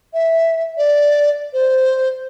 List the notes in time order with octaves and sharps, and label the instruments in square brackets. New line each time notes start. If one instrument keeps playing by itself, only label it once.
[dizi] E5
D5
C5